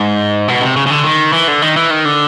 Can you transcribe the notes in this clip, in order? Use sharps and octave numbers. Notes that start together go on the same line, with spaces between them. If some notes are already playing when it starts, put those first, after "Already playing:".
Already playing: G#2
B2
C3
C#3
C#3
D3
D#3
E3
D3
D#3
E3
D#3
D3